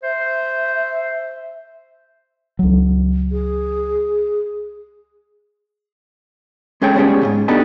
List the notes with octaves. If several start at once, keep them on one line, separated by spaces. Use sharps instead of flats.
C5 E5
C#2 F#3
G#4
G#3 C#4 G#4 A4 C#5 G5
G3 G#3 B3 C#4 G#4
C#2 G#2
B3 D4 D#4 G4 A4 B4